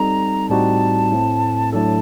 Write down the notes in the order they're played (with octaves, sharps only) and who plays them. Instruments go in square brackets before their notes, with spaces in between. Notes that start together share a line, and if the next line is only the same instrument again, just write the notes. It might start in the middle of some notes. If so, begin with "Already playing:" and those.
Already playing: [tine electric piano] G3 C4 D#4 A4 [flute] A#5
[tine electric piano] A2 G3 C4 D#4 F#4 [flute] A5
[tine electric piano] A2 A3 C4
[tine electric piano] A2 F#3 A3 D4 A4 [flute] A5